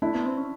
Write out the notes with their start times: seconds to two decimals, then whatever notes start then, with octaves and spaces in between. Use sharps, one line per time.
0.02 A3 D4 E4
0.14 B3
0.26 C4
0.37 C#4